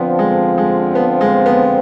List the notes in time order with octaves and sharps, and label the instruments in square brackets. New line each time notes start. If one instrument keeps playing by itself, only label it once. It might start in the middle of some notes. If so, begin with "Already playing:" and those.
Already playing: [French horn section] D3 F3 C4 [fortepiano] B3
[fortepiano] G#3
G#3
B3
G#3
B3